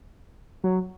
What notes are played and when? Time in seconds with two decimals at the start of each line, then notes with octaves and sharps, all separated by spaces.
0.64 F#3